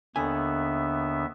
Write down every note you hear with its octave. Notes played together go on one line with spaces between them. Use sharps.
D#2 D3 B3 E5 G#5